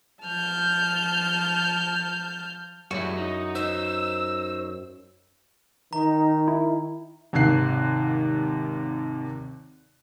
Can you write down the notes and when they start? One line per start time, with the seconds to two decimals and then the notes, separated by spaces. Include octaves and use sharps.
0.23 F3 A5 F6 G6
2.91 F#2 G3 E4 F#4 G#4
3.17 D#4
3.55 D#4 C5 C#5 E6
5.93 D#3 D#4 A#5
6.48 E4
7.33 G#1 D#2 C3 F#6 C7